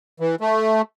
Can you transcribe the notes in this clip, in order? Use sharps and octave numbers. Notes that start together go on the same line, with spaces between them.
E3
A3